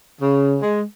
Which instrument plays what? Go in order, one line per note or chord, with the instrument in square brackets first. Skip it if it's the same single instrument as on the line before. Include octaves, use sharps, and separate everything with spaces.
[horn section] C#3
G#3